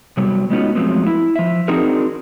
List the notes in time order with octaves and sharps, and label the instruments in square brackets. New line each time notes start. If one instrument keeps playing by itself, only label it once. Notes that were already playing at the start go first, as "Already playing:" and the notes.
[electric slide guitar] C3 F#3 G3 B3
G#3 B3 C#4 D#4 F4 F#4
F3 F#3 G#3 A3 B3 C4
E4
F3 E5
C4 D4 D#4 F#4 G#4 A#4